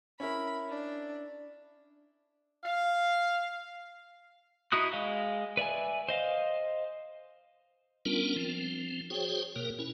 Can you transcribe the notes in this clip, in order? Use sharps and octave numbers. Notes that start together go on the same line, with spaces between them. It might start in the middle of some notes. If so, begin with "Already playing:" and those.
C#4 E4 A#4 B5
D4
F5
D#4 E4 F#4 D#6 F#6
G#3 D#5 F5
B4 D5 E5 G#5
C5 D#5 F5
G3 B3 C#4 D4 F4 A#4
F3 C4
F#4 G#4 C5 C#5 G5
B2 A#3 A#4
C#4 E4